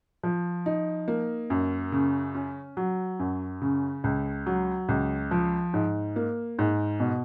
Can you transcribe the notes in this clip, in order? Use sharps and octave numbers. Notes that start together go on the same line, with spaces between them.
F3
D#4
A#3
F#2
C#3
C#4
F#3
F#2
C#3
C#2
F#3
C#2
F3
G#2
A#3
G#2
B2